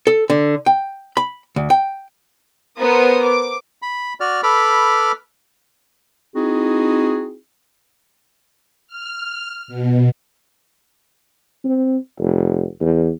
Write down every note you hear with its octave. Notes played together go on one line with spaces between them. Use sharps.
A4
D3
G5
B5
D2
G5
B3 A#4 C5 D#6
D6
B5
F#4 D5 F6
A4 B4 B5 D6 F6
C4 D#4 E4 F#4 G#4
F6
B2
C4
F1
E2